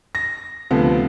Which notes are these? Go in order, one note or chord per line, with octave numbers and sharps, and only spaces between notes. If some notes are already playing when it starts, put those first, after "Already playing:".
A#6
D2 C3 F3 B3